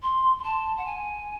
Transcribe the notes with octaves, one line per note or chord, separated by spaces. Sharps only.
C6
C6
A5
F#5
G#5